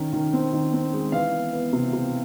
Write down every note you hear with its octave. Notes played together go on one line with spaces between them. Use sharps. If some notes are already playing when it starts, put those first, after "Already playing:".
Already playing: D#3 C#4
D#3
C4
D#3
C4
G#3
E3 F5
B3
B3
C3
C3